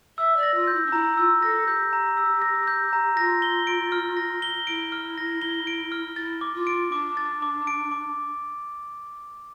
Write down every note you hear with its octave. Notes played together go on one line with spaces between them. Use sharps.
E5 E6
D5
A#6
F4
G6
E4
D4
E4 A#5
F4 E6
A4 A#6
G4 G6
A#5
E6
A#6
G6
A#5
F4 A#6
G7
D7
F6
A#6
G7
E4 D7
F6
A#6
G7
D7
F6
E4 A6
D6
F4
D7
D4 D6
A6
D6
D7
D6